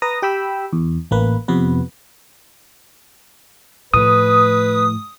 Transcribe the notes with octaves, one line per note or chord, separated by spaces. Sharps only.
B4 A#5 D#6 A#6
G4 G5 B5 E6
E2
A1 A#3 B4
F2 C3 B3 B4
A2 F3 B4 D#6